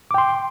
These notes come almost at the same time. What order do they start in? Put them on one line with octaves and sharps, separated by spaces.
D6 G5 C6